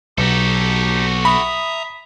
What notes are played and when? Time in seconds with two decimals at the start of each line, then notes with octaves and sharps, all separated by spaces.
0.18 B1 D#4 F#4 G4 A4
1.25 E5 A#5 B5 D#6